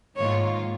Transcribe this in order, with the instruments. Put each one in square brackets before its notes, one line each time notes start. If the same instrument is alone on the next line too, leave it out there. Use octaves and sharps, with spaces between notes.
[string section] G#2 D#3 A#3 F4 [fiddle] C#5